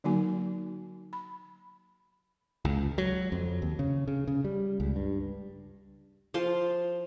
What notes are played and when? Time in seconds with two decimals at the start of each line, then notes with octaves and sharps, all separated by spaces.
0.04 D3 F#3 A#3 D#4 F#4 G#5
1.13 B5
2.65 C#2
2.98 F#3
3.32 F2
3.62 D#2
3.79 C#3
4.08 C#3
4.28 C#3
4.44 G3
4.80 C#2
4.96 G2
6.34 F3 F5 C6